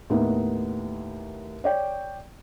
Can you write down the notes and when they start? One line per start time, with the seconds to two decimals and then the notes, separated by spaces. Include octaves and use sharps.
0.10 D#2 A2 B3 D#4
1.64 C#5 D5 G5